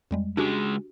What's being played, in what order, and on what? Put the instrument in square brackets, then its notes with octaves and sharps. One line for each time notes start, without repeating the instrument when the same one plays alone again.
[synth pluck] F2 G3 G#3
[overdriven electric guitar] C#2 G#3 [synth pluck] D4 F#4 G4